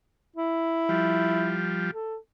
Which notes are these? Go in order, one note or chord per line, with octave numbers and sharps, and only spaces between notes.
E4
F3 G3
A4